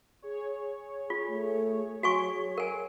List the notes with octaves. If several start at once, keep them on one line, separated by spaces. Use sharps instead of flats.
G#4 C#5
F4
A3
F#3 F#4 G#5 C#6
A#4 G#5